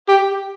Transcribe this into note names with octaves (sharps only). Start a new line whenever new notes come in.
G4